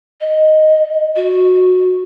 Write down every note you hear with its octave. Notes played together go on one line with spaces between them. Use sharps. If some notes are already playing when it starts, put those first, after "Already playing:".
D#5
F#4